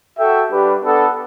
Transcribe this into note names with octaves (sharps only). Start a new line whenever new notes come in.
F#4 A4 E5 G5
G3 D4 G4 B4
B3 D4 A4